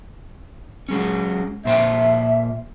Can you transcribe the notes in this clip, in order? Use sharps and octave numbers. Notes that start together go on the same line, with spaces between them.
F#3 G#3 C#4
A#2 C5 E5 G5